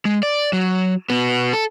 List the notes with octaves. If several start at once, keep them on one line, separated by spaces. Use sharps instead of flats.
G#3
D5
F#3
B2 B3
A4